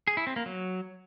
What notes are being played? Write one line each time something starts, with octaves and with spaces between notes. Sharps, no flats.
G#4
E4
C4
A#3
F#3